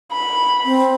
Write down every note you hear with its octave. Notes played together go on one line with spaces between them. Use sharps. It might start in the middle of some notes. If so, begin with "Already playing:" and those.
B5
C4